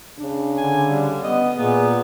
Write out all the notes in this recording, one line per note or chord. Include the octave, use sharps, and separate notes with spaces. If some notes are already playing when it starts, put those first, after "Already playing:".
C#3 D4
D3 G#5
G3
B3 D#5
A#2 A#3 B3 G#4